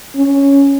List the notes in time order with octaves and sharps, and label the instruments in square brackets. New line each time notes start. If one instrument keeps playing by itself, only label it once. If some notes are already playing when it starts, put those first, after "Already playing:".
[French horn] C#4